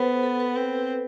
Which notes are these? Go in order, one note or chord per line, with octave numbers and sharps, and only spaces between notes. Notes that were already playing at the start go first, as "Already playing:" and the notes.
Already playing: B3 A4 B4 C5
A4
B4
C4